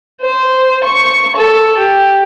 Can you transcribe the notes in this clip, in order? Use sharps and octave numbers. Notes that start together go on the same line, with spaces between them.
C5
C#6
A4
G4